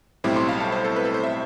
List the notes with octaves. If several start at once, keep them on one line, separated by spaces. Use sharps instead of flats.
B1 A2 G3 C4 E4 D6
C6
F5
A5
C5
A4
B4
A4
C5
E5